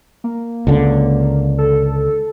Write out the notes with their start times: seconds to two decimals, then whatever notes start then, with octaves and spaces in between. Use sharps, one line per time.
0.24 A#3
0.67 C#2 D3
1.58 A4